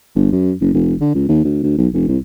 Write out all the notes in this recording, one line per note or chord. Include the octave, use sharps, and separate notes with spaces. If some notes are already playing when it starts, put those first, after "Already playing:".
G1
F#2
F#1
F1
D3
C#2
D#2
D2
D2
B1
F1
C2